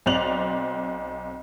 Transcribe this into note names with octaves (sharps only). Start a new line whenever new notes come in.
B1 C4 D5 F#6 F7 F#7